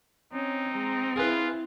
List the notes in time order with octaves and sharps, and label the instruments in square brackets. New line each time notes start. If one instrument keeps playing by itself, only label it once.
[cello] C4 [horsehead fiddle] C#4 [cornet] D#4
[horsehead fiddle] G#3 A#5
[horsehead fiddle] E4 [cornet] F4 [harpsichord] G#4 B4